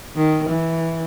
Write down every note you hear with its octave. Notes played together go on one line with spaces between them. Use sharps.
D#3
E3